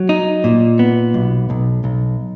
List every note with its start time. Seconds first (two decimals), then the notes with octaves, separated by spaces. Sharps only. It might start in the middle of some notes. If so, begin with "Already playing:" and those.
Already playing: F#3
0.09 D#4
0.44 A#2
0.79 B3
1.14 B1
1.50 B1
1.84 B1